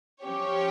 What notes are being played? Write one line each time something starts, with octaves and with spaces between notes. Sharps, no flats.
F3 C#4 G4 C#5